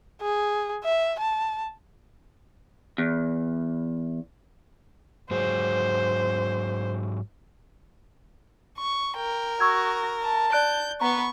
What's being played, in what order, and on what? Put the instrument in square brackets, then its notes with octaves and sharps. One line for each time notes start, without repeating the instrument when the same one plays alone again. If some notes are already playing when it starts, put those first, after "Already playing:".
[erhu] G#4
E5
A5
[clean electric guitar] E2
[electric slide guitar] G#2 F#3 G#4 [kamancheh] C5
[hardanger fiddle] C#6
[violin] A#4 [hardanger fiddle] G5
[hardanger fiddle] F#4 [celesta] C#6 E6 G#6
[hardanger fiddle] A5
[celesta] D5 F#6 D7 [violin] G6
[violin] B3 B4 [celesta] A#5 [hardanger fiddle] C#6